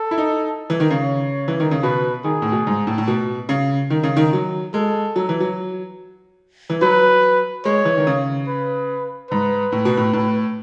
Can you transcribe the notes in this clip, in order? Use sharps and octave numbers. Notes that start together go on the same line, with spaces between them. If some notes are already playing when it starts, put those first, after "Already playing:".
Already playing: A4
E4
D#4
E3
D#3
C#3
C#5
E3
D#3
C#3
B2 B4
D#3 G#4
A2
B2
G#2
A2
A2
B2
C#3
D#3
C#3
D#3
F#3
G#3 A4
F#3
E3
F#3
E3
F#3 B4
G#3 C#5
E3
D#3
C#3
B4
G#2 B4
A2
B2
A2
A2